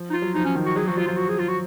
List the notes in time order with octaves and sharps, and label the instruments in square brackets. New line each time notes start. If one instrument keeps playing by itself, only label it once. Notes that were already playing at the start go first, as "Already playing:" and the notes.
Already playing: [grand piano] F3
[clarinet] D#4
F4
[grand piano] F#3
[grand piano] F3 [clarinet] D#4
[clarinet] C#4
[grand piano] D#3
[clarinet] F#4
[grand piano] F#3 [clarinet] G#4
[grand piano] F3 [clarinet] F#4
[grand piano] F#3 [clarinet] F4
[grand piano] F3 [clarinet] F4
[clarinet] F#4
G#4
F4
F#4